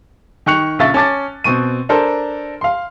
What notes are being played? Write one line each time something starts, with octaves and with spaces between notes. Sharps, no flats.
D#3 G5 C#6 F#6 C#7 F7
A#1 C#3 E5 F5 C#6 A6
C#4 A5 D6 A6
B2 C4 C#6 D#7
D4 A4 A#4 C5
F5 C6